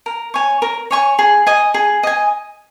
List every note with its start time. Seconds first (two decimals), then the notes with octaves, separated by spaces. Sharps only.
0.06 A#4
0.34 C#5 G#5 C#6
0.62 A#4
0.91 C#5 G#5 C#6
1.19 G#4
1.47 D#5 G#5
1.74 G#4
2.03 D#5 G#5